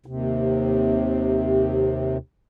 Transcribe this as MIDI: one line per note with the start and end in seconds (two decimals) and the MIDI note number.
0.06 2.18 39
0.06 2.18 48